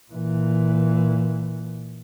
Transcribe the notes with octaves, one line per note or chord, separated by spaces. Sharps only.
A#2 E3